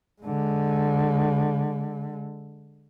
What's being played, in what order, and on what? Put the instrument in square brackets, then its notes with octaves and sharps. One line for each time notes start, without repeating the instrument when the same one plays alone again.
[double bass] D3 G#3